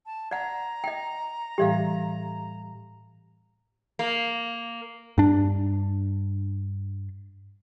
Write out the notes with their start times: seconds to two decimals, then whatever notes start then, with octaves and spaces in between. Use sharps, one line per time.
0.06 A5
0.31 D5 F#5 A#5
0.84 D#5 G5
1.58 A2 E3 G3 G4 D5 F5
3.99 A#3
5.18 G2 D4